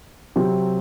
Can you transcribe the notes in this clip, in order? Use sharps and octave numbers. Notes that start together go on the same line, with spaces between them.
C3 F#3 C4 G4